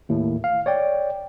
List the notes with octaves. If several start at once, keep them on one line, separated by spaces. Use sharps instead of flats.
D#2 A2
F5
C#5 D5 G5